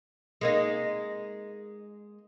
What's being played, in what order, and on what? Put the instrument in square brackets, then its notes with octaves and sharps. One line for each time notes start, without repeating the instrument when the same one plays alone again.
[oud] G#3 A#3 D#4